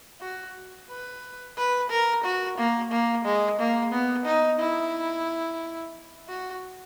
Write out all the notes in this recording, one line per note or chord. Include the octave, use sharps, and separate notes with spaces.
F#4
B4
B4
A#4
F#4
A#3
A#3
G#3
A#3
B3
D#4
E4
F#4